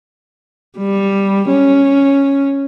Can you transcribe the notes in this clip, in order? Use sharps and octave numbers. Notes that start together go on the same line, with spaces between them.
G3
C#4